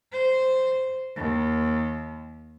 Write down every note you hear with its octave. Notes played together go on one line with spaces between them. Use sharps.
C5
D#2